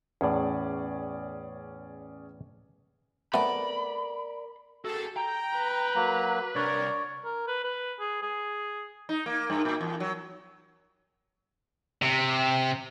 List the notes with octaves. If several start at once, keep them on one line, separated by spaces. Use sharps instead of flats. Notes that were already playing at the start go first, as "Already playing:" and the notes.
E2 A2 C#4 G#4 D5
A3 B3 C4 A#4 D5 B5
F#4 G#4 A4
G5 A#5
B4
F#3 A#3
C2 D4 A#4 C#5 D5
A#4
B4
B4
G#4
G#4
D#4
A#3
G2
A#2
E2
F#3
C3